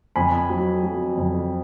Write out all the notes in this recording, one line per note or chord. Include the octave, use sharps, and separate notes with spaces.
F2 G#5 B5
F#3
F#3
F2